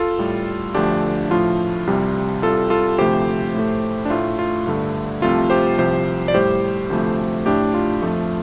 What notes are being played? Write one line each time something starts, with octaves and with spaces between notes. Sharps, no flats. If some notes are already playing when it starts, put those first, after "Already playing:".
Already playing: F4 A4
A2 G3
D2 D3 F3 A3 D4 G4
A2 F3 A3 F4
C2 C3 G3
C2 C3 G3 F4 A4
F4 A4
D2 C3 F3 A3 G4 C5
A2 A3
D4
A2 A3 F4
F4
G2 D3 A3
C2 C3 F3 A3 F4 A4
G4 C5
C2 C3 F3 G4 C5
D5
A2 G3 G4 C5
D2 C3 F3 A3
A2 A3 D4 G4
F4
F2 F3 A3